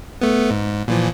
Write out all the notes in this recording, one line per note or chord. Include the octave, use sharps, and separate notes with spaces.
A3 B3
G#2
A#2 E3 F3